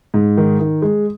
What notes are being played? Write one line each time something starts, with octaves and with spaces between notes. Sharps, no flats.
G#2
D#3
D#3
G#3